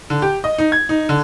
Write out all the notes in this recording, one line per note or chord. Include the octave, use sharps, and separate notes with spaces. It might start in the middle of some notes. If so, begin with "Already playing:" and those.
D3
G4
D#5
D#4
G#6
D#4
D3